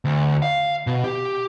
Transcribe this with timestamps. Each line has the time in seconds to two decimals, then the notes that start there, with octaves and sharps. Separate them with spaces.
0.05 D2
0.42 F5
0.87 B2
1.04 G4